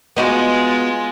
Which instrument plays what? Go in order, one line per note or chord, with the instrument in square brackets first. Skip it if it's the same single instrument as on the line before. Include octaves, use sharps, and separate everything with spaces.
[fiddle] G#3 F4 [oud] B3 D#4 F#4